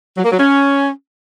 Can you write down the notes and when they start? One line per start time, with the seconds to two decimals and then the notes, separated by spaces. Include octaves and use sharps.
0.16 F#3
0.24 A#3
0.31 F#3
0.39 C#4